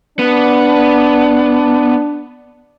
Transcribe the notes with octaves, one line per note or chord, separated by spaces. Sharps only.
B3 D4